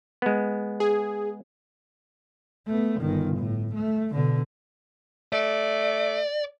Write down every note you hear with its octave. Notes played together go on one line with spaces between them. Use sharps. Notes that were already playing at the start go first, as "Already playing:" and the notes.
G#3 B3
G#4
A3 B3
G1 D#3
A2
A3
B2 D3
A3 D5